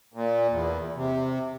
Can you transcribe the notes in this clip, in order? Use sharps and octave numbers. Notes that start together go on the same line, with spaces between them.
A#2
E2
C3